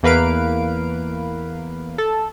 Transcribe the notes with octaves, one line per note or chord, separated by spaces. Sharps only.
E2 A#3 B4 F5 D7
A4